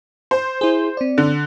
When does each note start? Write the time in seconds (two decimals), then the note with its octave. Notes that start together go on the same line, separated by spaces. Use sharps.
0.31 C5
0.61 E4 G#4
0.97 C4 D5
1.18 D3